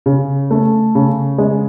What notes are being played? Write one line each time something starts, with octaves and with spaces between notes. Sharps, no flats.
C#3
A3
C#3
G#3